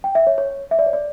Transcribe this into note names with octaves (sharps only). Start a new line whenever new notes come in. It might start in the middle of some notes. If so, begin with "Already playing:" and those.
G5
E5
C#5
C#5
E5
D5
C#5
D5